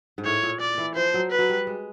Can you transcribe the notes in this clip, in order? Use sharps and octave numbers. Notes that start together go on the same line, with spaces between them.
G#2
A2 C#5
A#2
D5
E3
F3 C5
F#3
B4
F#3
G3
G#3